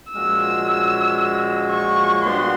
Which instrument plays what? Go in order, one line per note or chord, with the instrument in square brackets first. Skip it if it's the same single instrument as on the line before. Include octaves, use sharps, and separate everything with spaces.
[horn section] A#2 F3 G#3 C#4 F#4 [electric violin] E6
[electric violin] C#6
[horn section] A#2 G3 B3 D4 F#4 [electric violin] C6